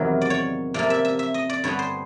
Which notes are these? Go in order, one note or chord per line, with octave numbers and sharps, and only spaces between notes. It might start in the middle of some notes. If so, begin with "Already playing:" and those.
Already playing: E2 C3 D#3 F#3 A#3
D5
C#5
C3 F3 A#3 D5
E5
E5
E5
D#5
D5
G2 D3 G3 B3 C#5
C5